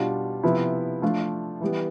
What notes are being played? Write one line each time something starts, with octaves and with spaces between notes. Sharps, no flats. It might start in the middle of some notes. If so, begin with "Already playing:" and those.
Already playing: B2 G3 D4 F4
C3 F3 B3 E4
F3 A3 D4 F4
E3 G3 B3